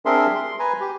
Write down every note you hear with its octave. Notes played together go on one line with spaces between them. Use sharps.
C4 D4 G#4 A#4 E5 C6
C6
B4 G#5 A#5
G4